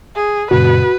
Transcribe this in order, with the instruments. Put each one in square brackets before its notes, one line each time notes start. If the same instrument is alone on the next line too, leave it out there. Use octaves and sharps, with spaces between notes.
[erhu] G#4
[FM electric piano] F#2 A#2 C#3 [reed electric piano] F#4 [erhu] B4